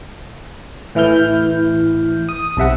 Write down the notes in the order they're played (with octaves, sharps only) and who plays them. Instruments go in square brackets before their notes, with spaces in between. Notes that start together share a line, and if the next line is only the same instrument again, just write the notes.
[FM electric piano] A2 E3 E4 F6 G6
D#6
B1 C3 E5 F#5